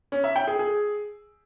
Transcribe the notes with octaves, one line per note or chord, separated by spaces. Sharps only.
C#4
E5
G5
G#4
G#4